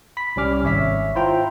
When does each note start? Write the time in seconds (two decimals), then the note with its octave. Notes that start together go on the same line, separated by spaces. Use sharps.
0.17 B5 B6
0.36 C2 G3 C#4 D6 F6
0.64 G#1 C#5 E5 B6
1.15 E4 F4 C5 G5 A#5